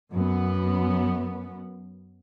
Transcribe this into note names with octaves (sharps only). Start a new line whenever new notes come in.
F#2 B3